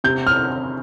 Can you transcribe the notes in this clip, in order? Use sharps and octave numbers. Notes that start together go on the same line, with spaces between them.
C3 G6
F6